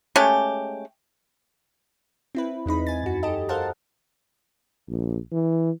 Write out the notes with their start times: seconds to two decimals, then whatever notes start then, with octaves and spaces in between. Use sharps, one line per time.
0.16 G#3 A3 C#4 G4
2.35 C4 E4 B4
2.66 E2 G#3 D#4 B5
2.87 G#5 A6
3.04 F#2 F#4
3.23 G4 A4 D#5
3.49 A4 A#4 C5 F5 F#5 A5
4.88 A#1
5.32 E3